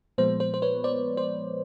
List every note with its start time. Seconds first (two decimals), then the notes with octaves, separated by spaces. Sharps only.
0.18 A#2 F3 G#3 B3 C5
0.40 C5
0.54 C5
0.62 B4 C#5
0.84 C5 D5
1.17 C5